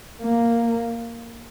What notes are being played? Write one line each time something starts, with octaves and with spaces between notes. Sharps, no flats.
A#3